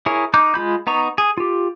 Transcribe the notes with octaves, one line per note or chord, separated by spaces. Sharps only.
E4 G#4 A#4 C#5
D#4 A#5 D6 F#6 G6
G#3 F4 B5 G6
B3 D#4 A#5 C#6
G#4
F4 G4